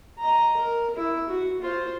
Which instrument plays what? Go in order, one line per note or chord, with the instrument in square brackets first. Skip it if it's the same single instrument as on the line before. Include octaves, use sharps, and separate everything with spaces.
[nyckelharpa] D#5 A#5
A#4
E4
F#4
F4 C5